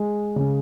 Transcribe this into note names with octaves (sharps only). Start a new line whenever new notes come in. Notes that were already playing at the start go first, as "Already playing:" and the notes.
Already playing: G#3
C#3